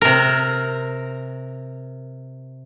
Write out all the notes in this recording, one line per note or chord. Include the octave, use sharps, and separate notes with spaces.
C3 A#4